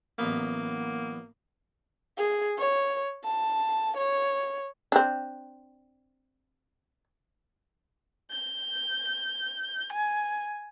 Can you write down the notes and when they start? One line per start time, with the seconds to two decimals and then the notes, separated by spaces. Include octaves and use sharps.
0.18 A1 F#3 A#3 B3
2.17 G#4
2.58 C#5
3.24 A5
3.97 C#5
4.92 C4 D4
8.31 G6
9.93 G#5